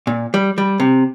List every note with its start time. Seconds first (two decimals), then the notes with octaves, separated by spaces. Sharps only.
0.07 A#2
0.34 G3
0.58 G3
0.80 C3